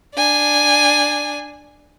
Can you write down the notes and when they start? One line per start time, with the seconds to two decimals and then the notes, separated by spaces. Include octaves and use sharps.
0.15 D4 G#5